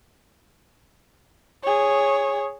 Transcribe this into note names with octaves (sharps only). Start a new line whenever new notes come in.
G#4 C#5